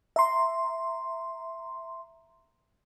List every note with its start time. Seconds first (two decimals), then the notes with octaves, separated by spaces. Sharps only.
0.16 E5 A#5 C6